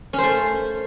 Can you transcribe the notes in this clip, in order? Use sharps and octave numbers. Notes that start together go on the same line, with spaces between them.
C#4
C5
A3